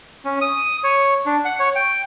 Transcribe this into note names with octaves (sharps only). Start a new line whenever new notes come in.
C#4
D#6
C#5
D4
F#5
C#5
G5